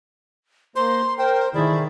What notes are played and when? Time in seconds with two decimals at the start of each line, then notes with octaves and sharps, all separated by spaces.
0.76 A#3 C5 A#5 C6
1.19 A#4 C5 G5
1.54 D#3 A3 E4 G#4 D5